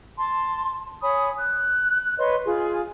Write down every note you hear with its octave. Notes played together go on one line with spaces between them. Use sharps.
A5 C6
C#5 G#5 B5 D#6
F#6
B4 C#5 D#5 C6
F4 G#4